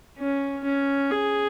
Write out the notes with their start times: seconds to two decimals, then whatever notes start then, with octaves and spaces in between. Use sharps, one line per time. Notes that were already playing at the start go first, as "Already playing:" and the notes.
0.18 C#4
0.64 C#4
1.11 G#4